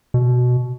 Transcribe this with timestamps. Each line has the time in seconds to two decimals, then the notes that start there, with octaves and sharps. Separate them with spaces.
0.14 B2